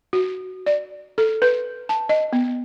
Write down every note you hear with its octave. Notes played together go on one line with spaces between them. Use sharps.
F#4
D5
A4
B4
A5
D#5
B3